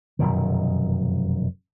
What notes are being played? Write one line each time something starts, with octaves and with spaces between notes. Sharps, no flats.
F1 F#2 B2 D#3